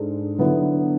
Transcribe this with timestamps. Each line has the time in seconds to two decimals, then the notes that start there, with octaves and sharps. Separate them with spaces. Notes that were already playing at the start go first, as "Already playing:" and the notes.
Already playing: G#2 G#3 D4 A4
0.39 D3 F#3 B3 E4 B4